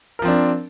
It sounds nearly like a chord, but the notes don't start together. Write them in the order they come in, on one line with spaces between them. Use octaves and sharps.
A#4 F3 C4 D4